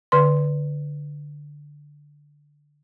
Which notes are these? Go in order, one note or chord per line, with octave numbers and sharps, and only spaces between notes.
D3 B4 C6